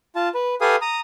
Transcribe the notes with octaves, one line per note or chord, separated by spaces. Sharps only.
F4 A5
B4
G4 A4 B4 F5 G#5 D#6
A#5 D#6